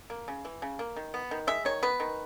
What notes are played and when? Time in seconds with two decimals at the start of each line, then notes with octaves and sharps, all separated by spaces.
0.10 A#3
0.28 C#3
0.45 E3
0.62 C#3
0.79 A#3
0.97 D#3
1.14 B3
1.31 D#3
1.47 G#3 E5
1.65 D#3 C#5
1.83 B3 B4
2.00 D#3